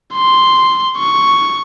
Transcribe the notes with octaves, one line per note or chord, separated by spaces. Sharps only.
C6
C#6